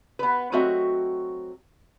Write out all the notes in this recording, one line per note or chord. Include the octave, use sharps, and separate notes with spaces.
B3 B4
F#3 A3 C4 F#4 D#5 E5